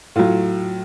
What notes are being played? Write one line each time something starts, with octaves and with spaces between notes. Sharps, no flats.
A2 F#3 F4